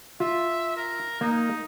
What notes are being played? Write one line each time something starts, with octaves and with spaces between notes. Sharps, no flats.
F4 E5
A#4
A#3 D#4